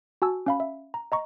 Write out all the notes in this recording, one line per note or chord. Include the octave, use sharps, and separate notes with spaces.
F#4 G#5 A5 E6
C#4 F5 B5
E5
A#5
D#5 A#5 C#6